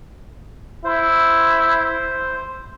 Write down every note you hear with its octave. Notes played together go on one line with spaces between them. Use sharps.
E4 C5